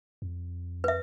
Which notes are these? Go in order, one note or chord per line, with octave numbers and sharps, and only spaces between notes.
F2
B4 E5